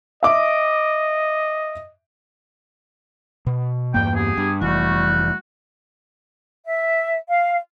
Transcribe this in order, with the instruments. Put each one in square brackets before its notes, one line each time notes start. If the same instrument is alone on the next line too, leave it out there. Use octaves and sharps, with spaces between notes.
[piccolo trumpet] D#5 [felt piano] E5 D6
[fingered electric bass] B2
[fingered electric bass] E2 G2 A#3 [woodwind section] G5
[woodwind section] B3 G4 G#4
[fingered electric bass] G2
[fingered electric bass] F1 E3 [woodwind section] G3 A3 F#4
[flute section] E5
F5